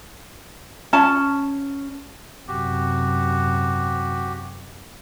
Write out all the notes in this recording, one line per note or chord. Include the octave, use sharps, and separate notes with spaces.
C#4 A5
F#2 C3 F#4 G4